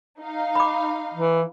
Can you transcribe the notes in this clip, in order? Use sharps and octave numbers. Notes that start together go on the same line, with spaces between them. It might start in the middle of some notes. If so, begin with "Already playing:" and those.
D#4 F5
B5 D6
E3